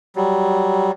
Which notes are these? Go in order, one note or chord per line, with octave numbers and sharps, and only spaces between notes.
F#3 G3